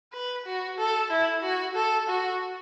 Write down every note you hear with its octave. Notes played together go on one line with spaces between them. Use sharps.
B4
F#4
A4
E4
F#4
A4
F#4